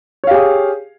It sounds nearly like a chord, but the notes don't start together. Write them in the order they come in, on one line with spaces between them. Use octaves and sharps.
C#5 F5 G4 G#4